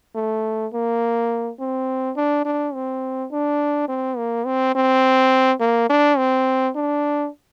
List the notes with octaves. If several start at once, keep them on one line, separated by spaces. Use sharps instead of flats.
A3
A#3
C4
D4
D4
C4
D4
C4
A#3
C4
C4
A#3
D4
C4
D4